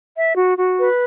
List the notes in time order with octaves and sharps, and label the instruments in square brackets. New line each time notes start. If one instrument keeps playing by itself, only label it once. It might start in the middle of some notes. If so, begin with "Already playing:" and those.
[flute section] E5
F#4
F#4
B4